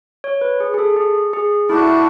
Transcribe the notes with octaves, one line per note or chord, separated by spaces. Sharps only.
C#5
B4
G#4
G#4
A4
G#4
G#4
A3 D4 E4 F#4